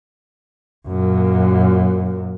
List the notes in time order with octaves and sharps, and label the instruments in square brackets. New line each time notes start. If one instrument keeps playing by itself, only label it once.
[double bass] F#2 A#2